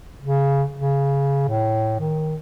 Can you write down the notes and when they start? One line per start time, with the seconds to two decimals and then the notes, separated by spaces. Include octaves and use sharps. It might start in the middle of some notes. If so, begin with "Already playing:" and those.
0.21 C#3
0.78 C#3
1.48 A2
2.00 D#3